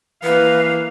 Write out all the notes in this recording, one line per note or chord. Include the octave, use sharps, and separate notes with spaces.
E3 A#3 B4 F5